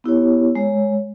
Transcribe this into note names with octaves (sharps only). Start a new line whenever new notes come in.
B3 E4 G4 C#5
G#3 C#5